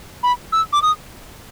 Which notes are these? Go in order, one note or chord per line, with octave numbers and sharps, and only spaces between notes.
B5
E6
D6
D#6